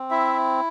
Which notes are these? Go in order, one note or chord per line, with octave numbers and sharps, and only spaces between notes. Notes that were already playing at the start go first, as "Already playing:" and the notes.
Already playing: C4
E4 E5